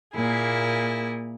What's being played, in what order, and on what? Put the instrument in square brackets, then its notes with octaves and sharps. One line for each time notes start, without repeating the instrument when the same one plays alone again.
[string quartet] A#2 A#3 E4 G#4